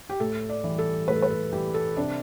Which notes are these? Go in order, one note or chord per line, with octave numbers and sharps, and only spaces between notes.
G4
A2 A4
D5
E3 G3
A4
A2 B4
A4
B4
A4
E3 G3 G4
A4
C3 D4